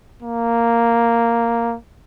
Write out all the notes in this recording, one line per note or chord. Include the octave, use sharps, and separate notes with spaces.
A#3